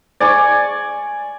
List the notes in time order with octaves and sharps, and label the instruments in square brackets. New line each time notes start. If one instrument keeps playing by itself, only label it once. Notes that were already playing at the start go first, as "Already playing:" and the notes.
[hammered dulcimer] D5 G#5 C#6